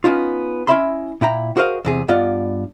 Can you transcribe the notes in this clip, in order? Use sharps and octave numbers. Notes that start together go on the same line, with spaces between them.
B3 C#4 D#4 F4
C#4 E4 D#5 E5 B5 C6
A#2 E4 G5 A#5
F#4 G#4 A#4 C5 D#5 F5
E2 C3 G#4
G2 B3 F4 D5 D#5